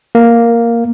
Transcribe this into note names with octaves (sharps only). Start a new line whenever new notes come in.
A#3